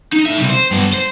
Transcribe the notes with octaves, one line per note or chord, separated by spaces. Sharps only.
D#4
A2 E5
C3 G3
C5
G2 B3
C5